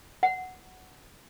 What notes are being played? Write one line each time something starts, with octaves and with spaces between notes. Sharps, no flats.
F#5